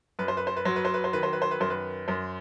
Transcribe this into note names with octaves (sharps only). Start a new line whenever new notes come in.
F#2 B4
C5
B4
C5
B4
F#3 C5
B4
C5
B4
C5
D#3 B4
C5
B4
C5
B4
F#2 C5
B4
F#2 C5